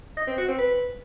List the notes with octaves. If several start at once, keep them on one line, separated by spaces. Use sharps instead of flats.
D#5
C4
F#4
C4
B4